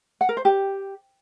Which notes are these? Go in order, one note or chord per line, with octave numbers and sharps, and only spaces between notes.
F#5
A#4
C5
G4